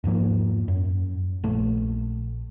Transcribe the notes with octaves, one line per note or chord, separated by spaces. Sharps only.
E2 G#2 F3 A#3
F#2
A#1 A3